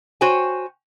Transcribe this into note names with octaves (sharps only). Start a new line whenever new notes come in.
F#4 C5 C#5 G5 G#5